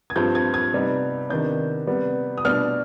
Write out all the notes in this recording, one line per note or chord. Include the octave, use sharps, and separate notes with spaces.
G#6
G2 F3 C4 G6
G#6
G#6
C3 G3 B3 D#4
C3 D#3 B3 D4 G6
C3 G3 B3
D#6
B2 G3 D4 F6